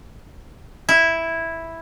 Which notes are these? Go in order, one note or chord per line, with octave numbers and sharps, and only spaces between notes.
E4